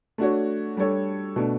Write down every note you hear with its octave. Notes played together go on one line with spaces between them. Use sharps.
A3 D4 F#4 C#5
G3 D4 A4 C#5
B2 A3 D4